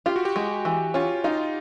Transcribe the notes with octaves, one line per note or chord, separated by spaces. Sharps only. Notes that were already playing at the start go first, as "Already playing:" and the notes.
F4 G4
F#4
G4
G#3
E3
C#4 F4
D#4 F4